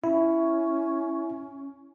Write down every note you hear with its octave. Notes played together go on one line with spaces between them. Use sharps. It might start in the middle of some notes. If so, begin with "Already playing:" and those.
C#4 E4